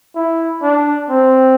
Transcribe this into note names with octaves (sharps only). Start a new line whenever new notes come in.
E4
D4
C4